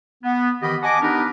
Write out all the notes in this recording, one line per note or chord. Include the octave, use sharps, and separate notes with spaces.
B3
D#3 E3 B3 G4 D#5 B5
D#5 F#5 G#5 A5 D6
B3 D4 D#4 G4 A#4 B4